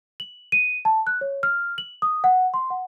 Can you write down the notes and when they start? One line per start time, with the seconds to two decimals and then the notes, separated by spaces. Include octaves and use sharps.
0.20 F#7
0.52 D#7
0.85 A5
1.07 F#6
1.21 C#5
1.43 F6
1.78 F#7
2.02 D#6
2.24 F#5
2.54 C6
2.70 F#5